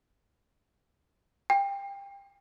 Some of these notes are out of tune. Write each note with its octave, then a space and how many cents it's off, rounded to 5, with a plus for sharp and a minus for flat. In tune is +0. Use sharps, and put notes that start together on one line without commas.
G5 +25